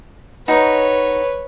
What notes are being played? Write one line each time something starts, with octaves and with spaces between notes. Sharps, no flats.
D#4 F#4 B4 C#5